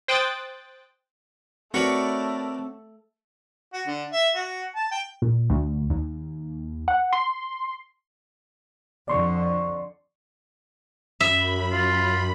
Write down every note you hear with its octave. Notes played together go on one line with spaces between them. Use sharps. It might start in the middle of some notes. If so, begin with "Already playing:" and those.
C5 G5 D#6 F#6 A6
A3 C4 F#4 A#4 B4 C#5 D5
F#4
D3
E5
F#4
A5
G5
A#2
D2
D#2
F#5
C6
F2 D3 D5 C6 C#6
F#2 E5 B5
F4